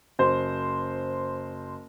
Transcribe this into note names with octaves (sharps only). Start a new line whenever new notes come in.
F#1 C5